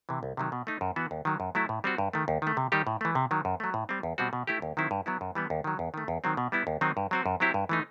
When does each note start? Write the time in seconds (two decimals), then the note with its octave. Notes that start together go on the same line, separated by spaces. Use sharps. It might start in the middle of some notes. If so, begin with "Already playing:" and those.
0.09 C3 E3
0.23 C2
0.37 C3 D#3 F#3
0.52 B2
0.67 A3 D#4
0.81 F#2
0.96 E3 B3 F#4
1.11 D#2
1.25 D#3 F#3
1.40 F#2
1.55 F#3 A3 E4
1.69 A2
1.84 G3 C4 F#4
1.98 G2
2.13 D#3 A3
2.28 D#2
2.42 D#3 A3
2.57 C3
2.72 D#3 G3 D#4 G4
2.87 A2
3.01 E3 A3
3.15 C3
3.31 D#3 F#3
3.45 F#2
3.60 F#3 A3
3.74 A2
3.89 G3 C4
4.03 E2
4.18 B2 G3 C4 F#4
4.33 B2
4.47 A3 E4 G4
4.62 D#2
4.77 D#3 F#3 C4 E4
4.91 G2
5.06 F#3 B3 E4
5.21 F#2
5.35 E3 G3 B3
5.50 D#2
5.64 D#3 F#3
5.79 E2
5.94 D#3 A3
6.08 E2
6.24 D#3 F#3 C4
6.37 B2
6.52 G3 B3 E4
6.67 D#2
6.81 D#3 F#3 C4 D#4
6.97 G2
7.11 F#3 C4 F#4
7.26 F#2
7.40 F#3 C4 E4 G4
7.54 G2
7.69 E3 A3 D#4